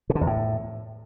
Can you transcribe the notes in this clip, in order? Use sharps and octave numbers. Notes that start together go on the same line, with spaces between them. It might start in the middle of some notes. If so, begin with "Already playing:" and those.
B2
D3
E2
A2